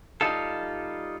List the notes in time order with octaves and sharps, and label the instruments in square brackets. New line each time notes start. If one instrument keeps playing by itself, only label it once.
[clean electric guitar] G3 D#4 F4 A4